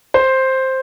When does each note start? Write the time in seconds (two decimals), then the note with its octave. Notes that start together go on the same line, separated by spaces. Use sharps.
0.14 C5